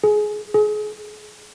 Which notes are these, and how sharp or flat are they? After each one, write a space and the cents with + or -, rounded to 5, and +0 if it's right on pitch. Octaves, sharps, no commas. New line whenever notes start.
G#4 +20
G#4 +30